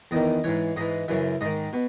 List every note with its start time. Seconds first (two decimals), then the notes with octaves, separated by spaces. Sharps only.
0.11 E2 D#3 D#5
0.44 G#2 E3 C#5
0.76 G#2 E3 D#5
1.08 F#2 C#3 E3 E5
1.41 G#2 D#3 D#5
1.73 B2